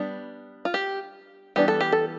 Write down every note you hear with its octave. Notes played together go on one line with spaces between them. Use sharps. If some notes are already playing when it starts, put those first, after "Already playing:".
Already playing: G3 B3 D4
F4
G4
E3 G3 B3 D4 G4
A4
G4
A4